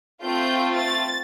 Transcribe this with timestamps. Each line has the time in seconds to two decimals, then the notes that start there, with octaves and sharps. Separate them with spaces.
0.21 A3 C4 F4 G6
0.76 A6